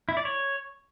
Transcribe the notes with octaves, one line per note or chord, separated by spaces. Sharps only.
E4
D5
C#5